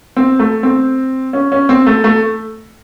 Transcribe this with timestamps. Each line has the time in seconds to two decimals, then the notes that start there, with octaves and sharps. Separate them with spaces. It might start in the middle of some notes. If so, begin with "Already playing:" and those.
0.17 C4
0.39 A3
0.63 C4
1.33 C#4
1.52 C#4
1.69 C4
1.86 A3
2.04 A3